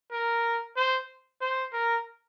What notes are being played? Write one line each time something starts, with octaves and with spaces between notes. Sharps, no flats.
A#4
C5
C5
A#4